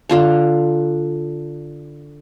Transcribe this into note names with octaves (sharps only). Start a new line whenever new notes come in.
D3 F4 A5